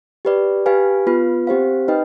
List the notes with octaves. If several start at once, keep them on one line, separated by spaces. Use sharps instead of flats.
G4 B4 D5
G4 B4 F5 G#5
B3 F4 B4
C4 G4 C5 F5
D#4 B4 D#5 G5